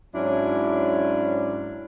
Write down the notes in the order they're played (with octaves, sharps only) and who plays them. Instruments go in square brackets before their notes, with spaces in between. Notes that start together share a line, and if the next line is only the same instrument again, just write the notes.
[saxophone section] G#2 F#3 C#4 D4 E4